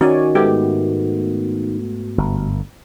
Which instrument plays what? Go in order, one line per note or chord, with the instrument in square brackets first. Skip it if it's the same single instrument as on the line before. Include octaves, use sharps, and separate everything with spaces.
[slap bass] D#3 [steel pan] C#4 [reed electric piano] F#4 [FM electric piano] C#5 D5 G#5
[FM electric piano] G#2 A3 B3 [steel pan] G4
[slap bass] G1